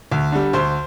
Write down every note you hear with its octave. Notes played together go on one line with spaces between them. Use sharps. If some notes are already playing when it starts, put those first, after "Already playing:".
D2
D3 G3
D2 C5 C6